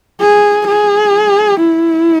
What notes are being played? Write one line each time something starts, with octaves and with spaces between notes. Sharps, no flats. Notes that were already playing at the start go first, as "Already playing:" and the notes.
G#4
G#4
E4